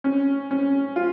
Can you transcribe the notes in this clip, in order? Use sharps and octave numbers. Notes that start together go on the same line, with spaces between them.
C#4
C#4
F4